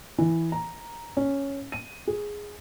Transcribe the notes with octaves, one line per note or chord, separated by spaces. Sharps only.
E3
A#5
C#4
D#7
G#4